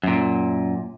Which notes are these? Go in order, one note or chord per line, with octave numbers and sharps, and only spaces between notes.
F#2 A#2